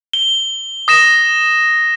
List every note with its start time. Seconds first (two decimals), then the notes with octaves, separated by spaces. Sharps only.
0.13 G7
0.88 D#6 A#6 E7